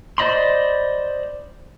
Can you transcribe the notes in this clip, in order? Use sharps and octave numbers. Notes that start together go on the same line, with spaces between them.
C5 D5 D#5 B5 C6